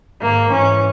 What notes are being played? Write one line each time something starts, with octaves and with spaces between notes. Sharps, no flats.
G#2 D#3 A#3
G#2 E3 C#4